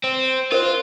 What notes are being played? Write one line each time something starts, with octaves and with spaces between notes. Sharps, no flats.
C4
F4 A#4 C5